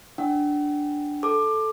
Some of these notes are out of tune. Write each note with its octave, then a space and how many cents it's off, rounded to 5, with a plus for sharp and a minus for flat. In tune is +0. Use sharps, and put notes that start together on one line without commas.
D4 +0 F#5 +45
A4 -5 D6 +20